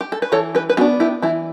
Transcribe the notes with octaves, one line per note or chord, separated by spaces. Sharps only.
G4
A4
B4
E3 A4 C#5
G4 B4
B4
B3 D4 F#4 A4
E4 G4
E3 E4